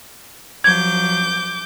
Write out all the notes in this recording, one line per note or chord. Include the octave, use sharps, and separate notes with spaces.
F3 F#3 D6 G6 G#6